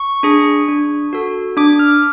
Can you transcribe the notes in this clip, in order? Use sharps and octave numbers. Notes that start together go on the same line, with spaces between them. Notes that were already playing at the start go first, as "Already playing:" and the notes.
Already playing: C#6
D4 G#4
D4
F#4 A4
D4 D6
F6